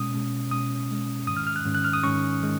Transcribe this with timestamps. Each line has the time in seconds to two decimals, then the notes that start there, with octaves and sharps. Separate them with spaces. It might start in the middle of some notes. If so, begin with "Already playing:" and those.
Already playing: B2 G#3 C#4 D#6
0.14 B2 G#3 C#4
0.51 B2 G#3 C#4 D#6
0.89 B2 G#3 C#4
1.27 G#2 D#3 G#3 C#4 D#6
1.37 F6
1.47 F6
1.56 F#6
1.65 G#2 D#3 G#3 C#4
1.75 F#6
1.84 F6
1.93 D#6
2.03 G#2 D#3 G#3 C#4 C#6
2.42 D#3 G#3